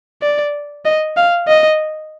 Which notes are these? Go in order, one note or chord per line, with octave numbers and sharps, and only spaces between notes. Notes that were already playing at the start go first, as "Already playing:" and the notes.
D5
D#5
F5
D#5